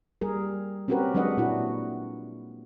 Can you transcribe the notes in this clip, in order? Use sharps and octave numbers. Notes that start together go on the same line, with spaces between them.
G3 G#4 A#4
C4 C#4 F#4 G4 A#4 B4
F#3 G#3 D4 B4 D#5 F#5
A#2 D4 E4 F#4